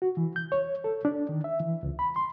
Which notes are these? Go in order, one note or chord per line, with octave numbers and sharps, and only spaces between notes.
F#4
E3
G6
C#5
A4
D4
D#3
E5
E3
C#2
B5
C6